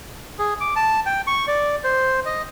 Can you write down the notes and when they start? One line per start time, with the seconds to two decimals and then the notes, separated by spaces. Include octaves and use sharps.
0.39 G#4
0.61 D6
0.76 A5
1.06 G5
1.27 C#6
1.48 D5
1.84 C5
2.26 D#5